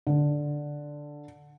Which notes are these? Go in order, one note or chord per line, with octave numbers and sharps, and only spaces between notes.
D3